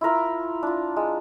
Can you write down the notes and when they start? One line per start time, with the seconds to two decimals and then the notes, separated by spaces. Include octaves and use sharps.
0.01 E4 F4 A#4 E5
0.63 D4 F4
0.96 G#3